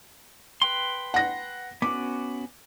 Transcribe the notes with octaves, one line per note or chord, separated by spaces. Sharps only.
B4 G5 C6
F#5 A#6
B3 C#4 F#4 D6